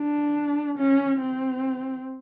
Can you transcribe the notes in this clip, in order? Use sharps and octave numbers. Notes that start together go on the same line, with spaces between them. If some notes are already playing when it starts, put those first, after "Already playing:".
Already playing: D4
C#4
C4